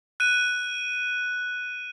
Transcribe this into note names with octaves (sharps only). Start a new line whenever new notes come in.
F#6 D#7